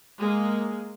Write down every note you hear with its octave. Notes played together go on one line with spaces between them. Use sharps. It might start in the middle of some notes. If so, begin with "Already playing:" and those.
G#3 A#3